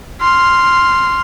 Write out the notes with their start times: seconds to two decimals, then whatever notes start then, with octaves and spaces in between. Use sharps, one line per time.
0.21 C6 F6